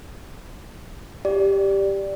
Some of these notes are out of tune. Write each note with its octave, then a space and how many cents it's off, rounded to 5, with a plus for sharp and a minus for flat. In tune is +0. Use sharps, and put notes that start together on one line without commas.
G4 +0 D5 +0